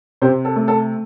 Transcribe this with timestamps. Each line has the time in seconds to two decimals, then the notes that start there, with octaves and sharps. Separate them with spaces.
0.22 C3 G4 C5
0.45 A4
0.56 A3
0.68 A4